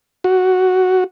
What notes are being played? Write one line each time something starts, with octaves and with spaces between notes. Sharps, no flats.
F#4